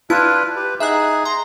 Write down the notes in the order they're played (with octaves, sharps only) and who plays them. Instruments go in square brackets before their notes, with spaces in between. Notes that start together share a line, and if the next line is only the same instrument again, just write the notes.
[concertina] D4 F4 B4 [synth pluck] E4
[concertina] G4 B4
[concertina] D#4 G#4 [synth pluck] E5 F#5 F#6
[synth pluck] A#5 [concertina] C6